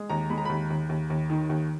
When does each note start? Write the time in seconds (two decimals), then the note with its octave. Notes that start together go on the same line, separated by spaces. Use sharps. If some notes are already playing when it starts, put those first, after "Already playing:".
Already playing: G#3
0.10 D#2 A#5
0.30 G#3 B5
0.38 A#5
0.45 D#2 B5
0.70 D#2
0.89 D#2
1.10 D#2
1.30 D#3
1.49 D#2